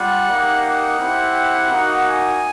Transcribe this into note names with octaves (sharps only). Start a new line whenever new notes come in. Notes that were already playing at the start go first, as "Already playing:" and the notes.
Already playing: G3 F4 F#5
A#3 D#4 G4
F#5
C4 E4 G4
A#3 D#4 F#4
G#5